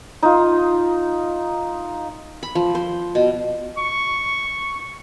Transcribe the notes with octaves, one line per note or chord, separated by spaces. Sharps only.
D#4 F4
B5
F3
C5
B2
C#6